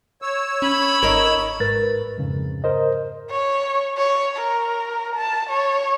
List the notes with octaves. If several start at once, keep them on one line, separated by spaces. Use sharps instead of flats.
C#5 E6
C#4 B5
G#1 D#4 A#4
G#2 A#4 B4 A6
F2 G#2 C#3
A#4 C5 D#5
C#5
C#5
A#4
A5
C#5